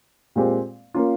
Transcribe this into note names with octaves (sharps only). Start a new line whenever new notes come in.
A#2 G#3 C4 G4
A#3 C#4 F4